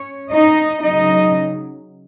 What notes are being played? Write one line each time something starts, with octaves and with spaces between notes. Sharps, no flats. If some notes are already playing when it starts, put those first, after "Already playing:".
Already playing: C#4 C#5
D#4 D#5
C#3 F#3 D#4 D#5